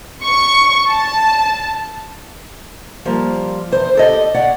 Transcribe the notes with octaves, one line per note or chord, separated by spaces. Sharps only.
C#6
A5
F3 G3 A#3
E2 C5
G4 A4 D#5
C#5 D5 F#5